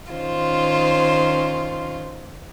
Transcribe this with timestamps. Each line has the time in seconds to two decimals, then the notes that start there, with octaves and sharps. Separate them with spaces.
0.12 D#3 C#4 F4 C5